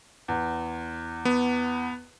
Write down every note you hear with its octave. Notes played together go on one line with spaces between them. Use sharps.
E2
B3